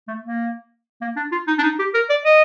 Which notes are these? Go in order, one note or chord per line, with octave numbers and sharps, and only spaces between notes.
A3
A#3
A#3
D4
F4
D#4
D4
D#4
G4
A#4
D5
D#5